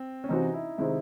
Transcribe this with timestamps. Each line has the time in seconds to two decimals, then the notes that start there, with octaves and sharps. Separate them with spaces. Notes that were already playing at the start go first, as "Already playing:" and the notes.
Already playing: C4
0.24 C#4
0.29 C3 E3 C4 D#4 F#4
0.54 E4
0.78 C3 D#3 G#3 C4 E4